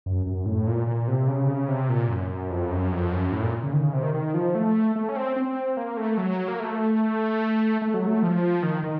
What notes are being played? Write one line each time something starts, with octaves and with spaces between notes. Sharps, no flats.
F#2
F#2
A2
A#2
A#2
C3
C#3
C3
C#3
C3
A#2
F#2
F2
F#2
F2
F#2
A2
A#2
C#3
D#3
C#3
C3
D#3
D#3
F3
A3
A3
C#4
C4
C4
A#3
A3
F#3
A#3
A3
A3
F#3
A3
F3
D#3
D#3